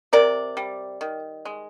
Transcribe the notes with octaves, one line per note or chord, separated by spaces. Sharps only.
C3 A#4 D5
G3
D#3
G#3